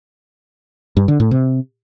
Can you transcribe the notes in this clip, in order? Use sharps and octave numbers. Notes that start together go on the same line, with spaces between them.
G2
D3
A2
C3